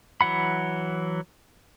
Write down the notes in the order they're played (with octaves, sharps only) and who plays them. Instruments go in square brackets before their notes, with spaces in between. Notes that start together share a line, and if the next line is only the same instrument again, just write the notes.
[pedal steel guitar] E3 F#3 F#5 B5